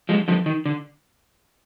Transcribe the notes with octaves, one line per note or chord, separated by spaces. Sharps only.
F3 G#3
D3 F3
D#3
D3